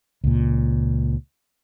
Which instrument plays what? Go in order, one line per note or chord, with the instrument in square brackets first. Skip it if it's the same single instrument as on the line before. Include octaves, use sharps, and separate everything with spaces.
[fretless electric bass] C#2 A#2